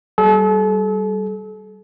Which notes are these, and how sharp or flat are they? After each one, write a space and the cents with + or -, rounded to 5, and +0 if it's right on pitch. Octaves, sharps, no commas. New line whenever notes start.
G3 -25 A4 -40